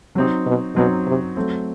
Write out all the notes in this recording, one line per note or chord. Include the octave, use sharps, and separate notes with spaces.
C3 F#3 C4 D#4
B2
B2 F#3 C4 D#4
C3
F#3 A3 C4